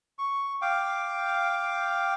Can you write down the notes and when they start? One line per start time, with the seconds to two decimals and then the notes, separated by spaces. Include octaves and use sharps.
0.18 C#6
0.62 F5 G5 D6